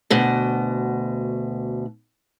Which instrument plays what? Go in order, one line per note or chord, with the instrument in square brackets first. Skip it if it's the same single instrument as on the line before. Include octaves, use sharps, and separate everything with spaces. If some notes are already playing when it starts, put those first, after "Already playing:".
[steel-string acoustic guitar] D2 B2